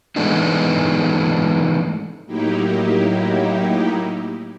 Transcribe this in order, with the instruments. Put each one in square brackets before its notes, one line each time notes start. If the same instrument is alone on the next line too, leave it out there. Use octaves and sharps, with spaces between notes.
[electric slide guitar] E3 G#3 A3 B3 D4 D#4
[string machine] A2 F#3 A#3 D#4 E4 G4